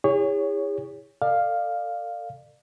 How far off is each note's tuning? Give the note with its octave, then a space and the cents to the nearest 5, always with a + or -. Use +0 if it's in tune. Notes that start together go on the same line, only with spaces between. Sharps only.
E4 -5 G#4 -40 C#5 +10
A4 +40 D5 +35 F5 +0